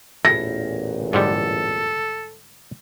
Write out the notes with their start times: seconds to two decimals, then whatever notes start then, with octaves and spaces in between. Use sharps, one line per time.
0.25 A1 E2 A#2 E4 A4 A#6
1.13 G#2 D3 G3 A4